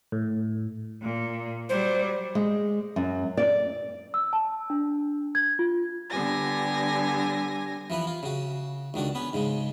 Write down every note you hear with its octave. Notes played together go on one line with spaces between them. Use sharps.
A2
A#2
F#3 G3 C5
G#3
F#2
D5
E6
A5
D4
G#6
F4
D3 G3 B3 G4 G#5 A#6
E3 F3 E4 B4
F4
C#3 F#4
C#2 D#3 D4 F#4
B3 C#4 B4
G#2 C#3 G#3